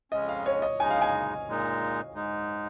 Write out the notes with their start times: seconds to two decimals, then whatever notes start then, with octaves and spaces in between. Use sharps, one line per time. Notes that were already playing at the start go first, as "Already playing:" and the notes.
0.12 F2 C#3 G#3 C#4 D#5
0.29 F5
0.46 C#5
0.62 D#5
0.79 C#3 G#3 D#4 G#5
0.90 F5
1.02 G#5
1.47 A#2 G#3 D#4
2.15 G#2 G#3 D#4